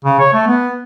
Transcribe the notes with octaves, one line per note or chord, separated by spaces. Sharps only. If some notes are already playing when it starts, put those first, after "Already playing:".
C#3
C#5
A3
B3